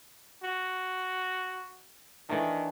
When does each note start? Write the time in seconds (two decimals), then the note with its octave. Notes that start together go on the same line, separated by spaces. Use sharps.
0.42 F#4
2.29 D#3 E3 A3 D4